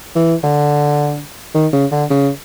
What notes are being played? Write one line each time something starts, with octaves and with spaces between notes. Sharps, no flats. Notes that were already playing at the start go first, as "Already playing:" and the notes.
E3
D3
D#3
C#3
D3
C#3